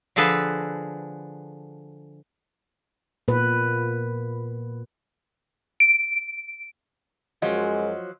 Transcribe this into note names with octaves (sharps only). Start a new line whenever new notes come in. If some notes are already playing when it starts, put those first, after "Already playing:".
D3 F3 G#4 A4 B4
A#2 B4
D7
F#2 F3 F#3 G#3 D#5